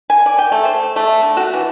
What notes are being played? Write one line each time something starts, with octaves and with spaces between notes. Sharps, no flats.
G#5
D5
G5
A3
C5
A3
D3
F#4
E3